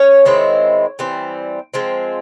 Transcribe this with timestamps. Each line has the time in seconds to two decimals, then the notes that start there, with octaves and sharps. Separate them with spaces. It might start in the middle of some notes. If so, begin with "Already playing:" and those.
Already playing: C#4 C#5
0.25 D#3 G#3 C4 E4
0.99 E3 G3 C4
1.74 F3 G#3 C4